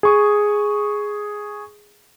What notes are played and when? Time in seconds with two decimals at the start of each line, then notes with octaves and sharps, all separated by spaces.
0.03 G#4 C#6 D#6